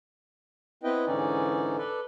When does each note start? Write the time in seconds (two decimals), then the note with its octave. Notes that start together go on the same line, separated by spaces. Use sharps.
0.83 B3 C4 E4 B4 D#5 G5
1.06 G#2 D3 E3 C#4 D#4 D5
1.78 A4 B4 D5